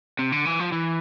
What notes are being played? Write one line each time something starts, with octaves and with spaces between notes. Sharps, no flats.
C3
D3
E3
F3
E3